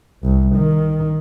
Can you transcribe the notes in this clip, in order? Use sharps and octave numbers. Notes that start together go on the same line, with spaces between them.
C2
D#3